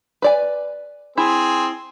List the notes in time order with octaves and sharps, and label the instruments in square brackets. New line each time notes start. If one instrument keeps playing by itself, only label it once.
[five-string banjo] B4 D5 G#5
[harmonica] C4 G#4 [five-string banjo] E4